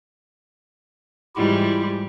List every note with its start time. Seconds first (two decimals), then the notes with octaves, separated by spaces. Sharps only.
1.36 G#2 E3 G3 E4 F4 G4